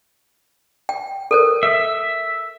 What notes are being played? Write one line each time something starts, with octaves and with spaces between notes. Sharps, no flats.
G5
A4 A#4 C5
E5